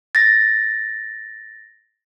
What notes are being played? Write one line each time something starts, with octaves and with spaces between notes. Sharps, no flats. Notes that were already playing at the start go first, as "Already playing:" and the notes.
A6 A#6